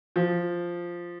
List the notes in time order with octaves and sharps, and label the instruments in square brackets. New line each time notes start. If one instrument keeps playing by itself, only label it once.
[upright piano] F3